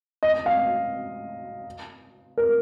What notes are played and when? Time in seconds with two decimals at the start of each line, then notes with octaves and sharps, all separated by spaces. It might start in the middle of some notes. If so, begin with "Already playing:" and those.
0.23 D#5
0.46 F5
2.38 A#4